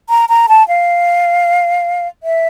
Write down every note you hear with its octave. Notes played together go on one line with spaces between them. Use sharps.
A#5
A#5
A5
F5
E5